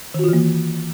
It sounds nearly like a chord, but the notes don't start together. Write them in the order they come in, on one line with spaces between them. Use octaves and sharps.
D#3 F#4 F4 E3 A#3